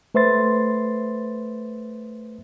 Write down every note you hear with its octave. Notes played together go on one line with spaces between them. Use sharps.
A3 B4 C5 E5 C6 A6